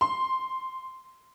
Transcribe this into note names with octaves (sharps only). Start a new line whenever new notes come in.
C6